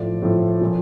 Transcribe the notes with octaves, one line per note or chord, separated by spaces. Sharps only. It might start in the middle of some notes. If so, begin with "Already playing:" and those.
Already playing: A2 F3 D5
A2 F3
A#2 F3